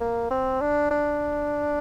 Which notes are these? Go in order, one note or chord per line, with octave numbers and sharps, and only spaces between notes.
A#3
C4
D4
D4